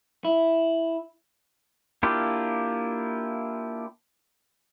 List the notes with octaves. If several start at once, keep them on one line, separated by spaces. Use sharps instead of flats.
E4
A#3 D4 E4 F4 G4